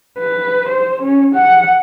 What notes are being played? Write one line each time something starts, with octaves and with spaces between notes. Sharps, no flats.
B4
C5
C#4
F#5